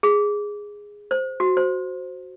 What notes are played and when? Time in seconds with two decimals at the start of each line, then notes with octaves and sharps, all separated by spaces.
0.03 G#4
1.11 C5
1.40 F#4
1.57 C5